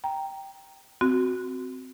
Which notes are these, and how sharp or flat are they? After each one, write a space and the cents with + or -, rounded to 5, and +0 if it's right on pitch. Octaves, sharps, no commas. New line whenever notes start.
G5 +0 A#5 +0
C4 -10 F#4 +0